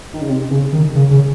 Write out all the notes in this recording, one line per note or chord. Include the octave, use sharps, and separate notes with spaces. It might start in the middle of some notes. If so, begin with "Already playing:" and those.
D#3
C#3
C3
C#3
D#3
C#3
C#3